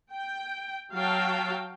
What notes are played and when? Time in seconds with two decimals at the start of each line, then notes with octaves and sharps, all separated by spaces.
0.12 G5
0.93 F#3 F#4 F5 G5 A5